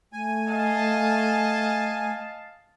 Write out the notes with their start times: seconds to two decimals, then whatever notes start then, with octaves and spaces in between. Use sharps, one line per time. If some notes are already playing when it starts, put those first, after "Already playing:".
0.13 A3 G#5
0.48 D#5 F5 A5